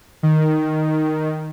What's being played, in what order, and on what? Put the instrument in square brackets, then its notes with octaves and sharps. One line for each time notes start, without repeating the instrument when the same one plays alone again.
[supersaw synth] D#3